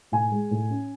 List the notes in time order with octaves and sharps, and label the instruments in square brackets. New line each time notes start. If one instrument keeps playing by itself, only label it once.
[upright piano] A2 G#5
G#3
A2
C#4